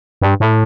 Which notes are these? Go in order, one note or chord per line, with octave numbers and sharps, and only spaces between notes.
G2
A2